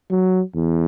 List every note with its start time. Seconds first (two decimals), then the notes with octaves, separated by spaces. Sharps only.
0.11 F#3
0.55 E2